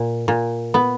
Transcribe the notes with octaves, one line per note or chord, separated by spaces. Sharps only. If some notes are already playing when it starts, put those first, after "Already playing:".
Already playing: A#2
A#2
B3